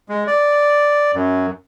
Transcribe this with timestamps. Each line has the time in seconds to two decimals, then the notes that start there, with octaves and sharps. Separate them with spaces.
0.09 G#3
0.27 D5
1.14 F#2